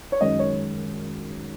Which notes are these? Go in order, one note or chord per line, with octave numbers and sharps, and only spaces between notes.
C#5
F#2 D#3 G#3 D#5
C#5